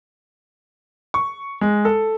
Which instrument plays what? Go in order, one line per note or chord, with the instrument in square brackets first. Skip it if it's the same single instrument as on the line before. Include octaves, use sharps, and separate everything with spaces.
[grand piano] C#6
G#3
A4